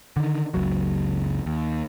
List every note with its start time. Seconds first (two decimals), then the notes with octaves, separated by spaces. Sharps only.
0.17 D3 D#3
0.54 F#1 C#2 F#3
1.46 D#2